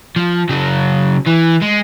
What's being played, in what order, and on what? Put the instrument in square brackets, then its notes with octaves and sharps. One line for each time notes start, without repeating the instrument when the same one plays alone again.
[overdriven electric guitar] F3
C#3 F#3
E3
G#3